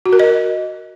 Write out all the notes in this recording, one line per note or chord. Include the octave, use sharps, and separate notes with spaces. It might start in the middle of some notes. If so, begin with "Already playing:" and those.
F#4
A#4
D#5